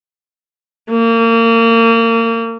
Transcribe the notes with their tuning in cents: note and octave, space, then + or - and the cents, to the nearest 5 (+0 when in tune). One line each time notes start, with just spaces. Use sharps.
A#3 -30